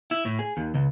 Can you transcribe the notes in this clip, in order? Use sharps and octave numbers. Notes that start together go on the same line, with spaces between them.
E4
A2
G#4
D#2
C#2